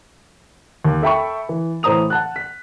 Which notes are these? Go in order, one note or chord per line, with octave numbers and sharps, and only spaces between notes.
D#2
A4 E5 G5 B5 C#6
E3
A2 E3 C5 A#5 D#6 F7
F#5 A5 F#6
B6